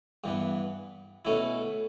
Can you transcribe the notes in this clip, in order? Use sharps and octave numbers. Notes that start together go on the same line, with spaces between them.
G2 E3 B3
B2 A3 C#4 E4